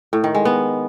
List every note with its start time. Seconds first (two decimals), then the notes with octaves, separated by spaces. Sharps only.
0.13 A2
0.24 D#3
0.35 G#3
0.45 B3